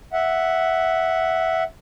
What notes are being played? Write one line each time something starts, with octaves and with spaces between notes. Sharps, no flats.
E5 F#5